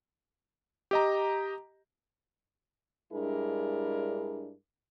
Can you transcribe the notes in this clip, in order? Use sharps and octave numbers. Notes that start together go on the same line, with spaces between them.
G4 D#5 A#5
G2 G#3 D4 E4 G#4 A#4